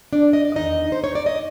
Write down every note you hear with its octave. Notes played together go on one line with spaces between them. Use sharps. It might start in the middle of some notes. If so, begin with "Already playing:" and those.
D4 D5
D#5
D5
E2 C3 D#3 D#4 D#5
C5
C#5
D5
D#5